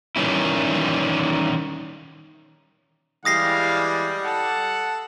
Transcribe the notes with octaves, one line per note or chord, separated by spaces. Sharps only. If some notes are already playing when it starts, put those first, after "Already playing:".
D#3 E3 G3 C#4 E4
E3 G3 G#3 F5 D#6 A#6 C7
A4 F#5 A5